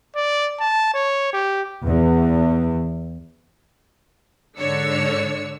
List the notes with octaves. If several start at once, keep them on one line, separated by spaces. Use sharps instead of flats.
D5
A5
C#5
G4
E2
G#2 D3 D4 C#5 E6 C#7